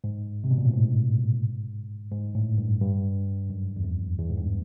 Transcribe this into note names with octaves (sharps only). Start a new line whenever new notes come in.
G#2
C3
B2
A#2
A2
G#2
G#2
A2
G2
G2
F#2
E2
F2
E2
G#2
G2